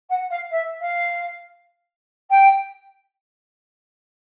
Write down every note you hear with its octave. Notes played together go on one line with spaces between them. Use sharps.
F#5
F5
E5
F5
G5